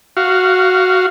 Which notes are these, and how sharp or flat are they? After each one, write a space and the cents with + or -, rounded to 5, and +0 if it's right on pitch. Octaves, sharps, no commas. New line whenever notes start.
F#4 +0 F5 -10